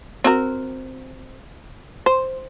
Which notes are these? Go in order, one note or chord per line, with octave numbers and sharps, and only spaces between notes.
C4 F#4 A#4
C5